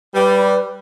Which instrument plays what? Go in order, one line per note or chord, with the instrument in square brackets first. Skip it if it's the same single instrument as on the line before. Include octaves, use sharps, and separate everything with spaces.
[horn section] G3 [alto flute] B4